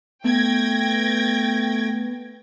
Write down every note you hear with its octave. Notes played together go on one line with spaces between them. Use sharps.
A3 B3 G5 G#6 A#6